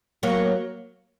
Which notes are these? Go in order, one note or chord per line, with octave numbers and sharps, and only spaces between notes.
F#3 A#3